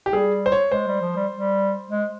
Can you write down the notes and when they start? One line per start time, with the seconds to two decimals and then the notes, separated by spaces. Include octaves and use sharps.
0.06 G4
0.13 G3 G#4
0.46 C5
0.52 C#5
0.72 G#3 C5
0.87 G3
1.01 F3
1.16 G3
1.32 G3
1.90 G#3